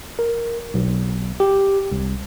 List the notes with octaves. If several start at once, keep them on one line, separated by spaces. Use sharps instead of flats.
A#4
B1
G4
C2